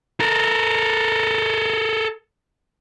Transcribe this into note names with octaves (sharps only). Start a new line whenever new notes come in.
A4 A#4